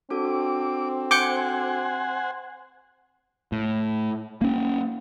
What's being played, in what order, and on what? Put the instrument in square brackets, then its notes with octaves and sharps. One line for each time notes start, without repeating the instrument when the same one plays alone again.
[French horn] C4 [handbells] D4 F#4 A4 [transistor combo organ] D6
[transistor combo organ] C5 F#5 G#5 [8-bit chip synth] D6 G6 C#7
[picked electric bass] A2
A#3 C#4